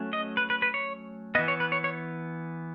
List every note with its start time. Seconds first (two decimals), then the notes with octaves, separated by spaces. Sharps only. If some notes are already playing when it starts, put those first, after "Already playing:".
Already playing: F#3 A3 C#4
0.13 D#5
0.37 B4
0.50 B4
0.62 B4
0.74 C#5
1.35 B3 D#5
1.39 E3
1.48 C#5
1.60 B4
1.72 C#5
1.84 C#5